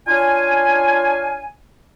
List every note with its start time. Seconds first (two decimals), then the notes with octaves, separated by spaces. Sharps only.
0.07 D4 F4 C#5 F5 G#5